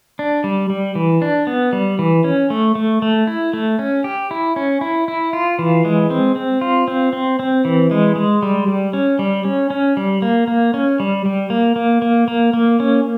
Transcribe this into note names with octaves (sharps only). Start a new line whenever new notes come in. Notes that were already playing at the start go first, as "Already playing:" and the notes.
D4
G3
G3
E3
D4
B3
G3
E3
C#4
A3
A3
A3
E4
A3
C#4
G4
E4
C#4
E4
E4
F4
E3
G#3
C4
C4
F4
C4
C4
C4
E3
G#3
G#3
G3
G3
C#4
G3
C#4
C#4
G3
A#3
A#3
C#4
G3
G3
A#3
A#3
A#3
A#3
A#3
C#4